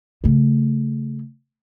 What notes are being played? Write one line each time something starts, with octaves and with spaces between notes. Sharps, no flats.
C#3 A3